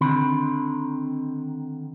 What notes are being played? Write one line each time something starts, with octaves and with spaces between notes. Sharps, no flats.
D3 D#3 C4 B5